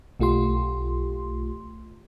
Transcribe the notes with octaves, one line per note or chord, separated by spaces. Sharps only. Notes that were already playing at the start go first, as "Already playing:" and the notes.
B1 A3 F4 G4 C6